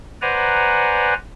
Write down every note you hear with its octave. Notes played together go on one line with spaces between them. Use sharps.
B4 C5 D5 F#5 G#5 A#5